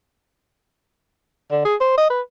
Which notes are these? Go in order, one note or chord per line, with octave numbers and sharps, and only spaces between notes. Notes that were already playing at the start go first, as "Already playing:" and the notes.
D3
G#4
C5
D#5
B4